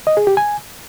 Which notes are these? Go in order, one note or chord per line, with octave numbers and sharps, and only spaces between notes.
D#5
G#4
G4
G#5